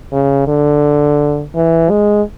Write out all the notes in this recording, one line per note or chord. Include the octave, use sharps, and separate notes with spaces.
C#3
D3
E3
G#3